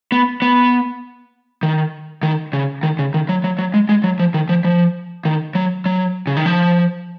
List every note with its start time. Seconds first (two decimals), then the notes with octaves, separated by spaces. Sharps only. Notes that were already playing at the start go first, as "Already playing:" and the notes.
0.12 B3
0.42 B3
1.63 D#3
2.23 D#3
2.53 C#3
2.83 D#3
2.99 C#3
3.14 D#3
3.29 F#3
3.44 F#3
3.59 F#3
3.74 G#3
3.89 G#3
4.04 F#3
4.19 F3
4.34 D#3
4.49 F3
4.65 F3
5.25 D#3
5.55 F#3
5.86 F#3
6.27 C#3
6.37 D#3
6.46 F3